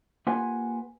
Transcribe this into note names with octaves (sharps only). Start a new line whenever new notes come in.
A#3 F4 G4 B4 F#5 G#5